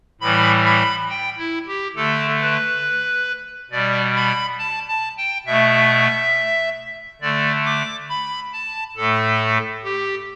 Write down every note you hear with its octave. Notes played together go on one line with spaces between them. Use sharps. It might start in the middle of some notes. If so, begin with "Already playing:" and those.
A2 E3 G3 B5
B5
G5
E4
G4
D3 A3 A4
B4
B2 G3 D5
B5
A5
A5
G5
B2 A3 E5
D3 A3 D5
D6
B5
A5
A2 A3 A4
G4